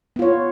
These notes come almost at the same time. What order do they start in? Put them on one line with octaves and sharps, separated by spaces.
B3 F4 C#5